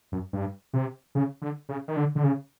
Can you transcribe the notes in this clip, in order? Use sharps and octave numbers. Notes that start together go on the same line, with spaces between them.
F#2
G2
C3
C#3
D3
C#3
D#3
D3
D3
C#3